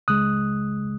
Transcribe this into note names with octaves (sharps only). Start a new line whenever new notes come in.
C#2 C#3 G#3 D#6 F#6